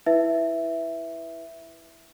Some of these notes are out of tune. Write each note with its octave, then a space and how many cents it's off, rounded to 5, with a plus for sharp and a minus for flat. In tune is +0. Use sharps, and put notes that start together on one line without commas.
E4 +0 B4 +0 E5 +0